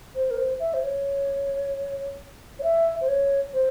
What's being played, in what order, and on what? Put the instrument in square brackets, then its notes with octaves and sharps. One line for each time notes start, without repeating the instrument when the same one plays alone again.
[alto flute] C5
A#4
C5
E5
C5
C#5
C#5
E5
C5
C#5
C5